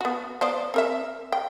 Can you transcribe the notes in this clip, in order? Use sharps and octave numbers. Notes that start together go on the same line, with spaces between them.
B3 F#4
B3 C5 D5
C4 A#4 E5
G5